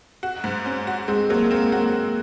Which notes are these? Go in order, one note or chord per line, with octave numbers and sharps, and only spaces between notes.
F#4
G#2
C#4
F#4
G#3 C4
F#3 A#3
A#3 C4
A#3 F#4